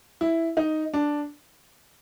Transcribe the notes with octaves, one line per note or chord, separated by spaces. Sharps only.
E4
D#4
D4